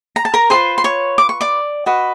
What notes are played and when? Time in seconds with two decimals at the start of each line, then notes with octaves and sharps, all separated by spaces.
0.16 A#5
0.25 A5
0.34 A#4 A#5
0.50 F4 G#4 B4 C5 C6
0.78 C6
0.84 C#5 C#6
1.18 D6
1.29 C#6
1.41 D5 D6
1.86 F#4 B4 D#5